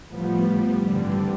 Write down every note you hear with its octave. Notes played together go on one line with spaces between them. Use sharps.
A2 F3 G3 B3
G3
G2 D3 E3 G3 C4